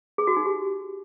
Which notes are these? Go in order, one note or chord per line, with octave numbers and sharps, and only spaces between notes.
G#4
F#4
D#4
G4